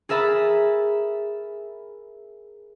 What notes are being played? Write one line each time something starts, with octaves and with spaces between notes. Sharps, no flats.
G#4 A#4 E5 A5 B5